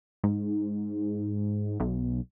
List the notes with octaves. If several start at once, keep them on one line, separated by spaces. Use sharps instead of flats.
G#2
B1